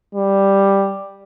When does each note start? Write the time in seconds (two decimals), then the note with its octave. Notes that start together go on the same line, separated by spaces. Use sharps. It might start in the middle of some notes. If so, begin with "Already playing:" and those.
0.15 G3